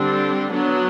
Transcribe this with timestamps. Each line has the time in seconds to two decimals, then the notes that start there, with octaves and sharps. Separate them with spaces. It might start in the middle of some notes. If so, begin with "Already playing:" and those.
Already playing: D3 G3 C4 D4
0.53 F#3 B3 D4